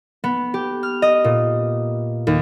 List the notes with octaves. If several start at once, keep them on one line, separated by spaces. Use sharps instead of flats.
B3
G4
F6
D#5
A#2
D#2